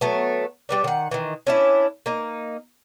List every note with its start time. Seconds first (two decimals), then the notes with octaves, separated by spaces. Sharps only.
0.01 F#3 A3 B3
0.69 G3 B3 D4
0.84 D#3 F#5
1.11 D#3 E3
1.47 C#4 D4 E4
2.06 A#3 D#4